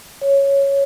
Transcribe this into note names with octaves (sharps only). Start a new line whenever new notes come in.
C#5